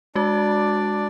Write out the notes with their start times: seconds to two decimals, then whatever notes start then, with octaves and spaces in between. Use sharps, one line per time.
0.15 G#3 D4 F#4 D5